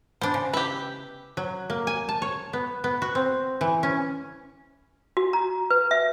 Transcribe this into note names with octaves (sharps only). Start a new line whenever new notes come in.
B3 D4 C5
C#3
G4 B4 E5
F#3
A#3
G#5
A5
C#5
B3
B3
F#4
C4
E3
C#4
F#4
A#5
B4
E5